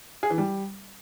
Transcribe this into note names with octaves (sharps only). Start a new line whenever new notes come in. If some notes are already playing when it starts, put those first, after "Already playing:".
G#4
E3
G3